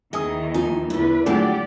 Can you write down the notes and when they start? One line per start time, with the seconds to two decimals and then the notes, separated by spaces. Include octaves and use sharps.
0.13 D#2 D#3 E3 G#4 D#5 G#5 D#6
0.54 F3 D#4 G#5
0.90 E2 A2 D3 E4 B4
1.26 A2 D3 F3 F#3 G#3 G4 D5 F#5